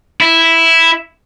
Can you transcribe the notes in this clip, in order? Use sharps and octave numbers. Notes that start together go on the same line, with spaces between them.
E4